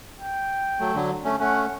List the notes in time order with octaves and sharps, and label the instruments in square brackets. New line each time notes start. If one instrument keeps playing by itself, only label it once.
[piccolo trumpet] G5
[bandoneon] F#3 A3
D3 F#3
A3 C#4
[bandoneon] A3 C#4 [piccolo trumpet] F#5